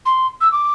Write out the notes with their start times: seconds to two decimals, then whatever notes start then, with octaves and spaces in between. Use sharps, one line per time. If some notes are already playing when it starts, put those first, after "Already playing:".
0.05 C6
0.41 E6
0.52 D6